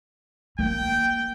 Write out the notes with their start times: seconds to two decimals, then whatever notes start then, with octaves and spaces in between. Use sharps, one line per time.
0.59 A#3 G5